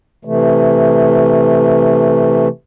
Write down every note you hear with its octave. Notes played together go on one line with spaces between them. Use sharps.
C3 E3 A3